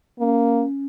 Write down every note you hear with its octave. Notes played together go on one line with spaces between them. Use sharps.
A#3 C#4